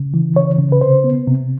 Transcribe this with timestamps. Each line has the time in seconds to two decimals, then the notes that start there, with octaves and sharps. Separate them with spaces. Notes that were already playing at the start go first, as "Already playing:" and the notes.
Already playing: C#3
0.14 E3
0.36 C#3 C#5
0.59 C#3
0.72 B4
0.81 C3 C5
1.04 B3
1.27 C3